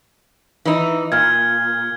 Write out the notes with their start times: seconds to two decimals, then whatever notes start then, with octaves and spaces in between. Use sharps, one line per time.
0.65 E3 D#4
1.12 A#2 F6 G#6